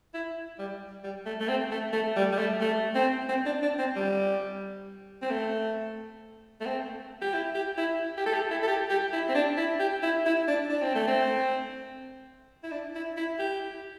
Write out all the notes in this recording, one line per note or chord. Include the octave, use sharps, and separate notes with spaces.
E4
G3
G3
A3
A3
C4
A3
A3
G3
G3
A3
A3
C4
C4
D4
D4
C4
G3
C4
A3
A3
C4
G4
E4
G4
E4
G4
A4
G4
E4
A4
G4
G4
E4
C4
D4
E4
G4
E4
E4
D4
D4
C4
A3
C4
E4
D4
E4
E4
G4